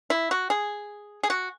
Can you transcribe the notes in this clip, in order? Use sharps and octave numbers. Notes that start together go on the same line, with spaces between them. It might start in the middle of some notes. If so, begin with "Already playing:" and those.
E4
F#4
G#4
G#4
F#4